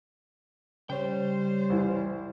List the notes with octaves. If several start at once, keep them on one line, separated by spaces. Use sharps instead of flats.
C#3 G3 C5 C#5 G5
C2 E3